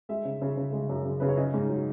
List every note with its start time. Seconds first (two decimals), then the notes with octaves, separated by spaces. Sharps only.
0.09 G#3 E5
0.25 C#3
0.42 C#3
0.57 C#3
0.73 G#3
0.89 F#2
1.05 C#3
1.20 C#3 B4
1.29 C#5
1.37 C#4 D#5
1.54 G#2
1.69 F#3